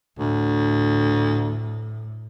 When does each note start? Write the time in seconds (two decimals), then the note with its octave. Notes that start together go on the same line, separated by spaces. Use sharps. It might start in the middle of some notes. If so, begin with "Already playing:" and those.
0.19 D2 A2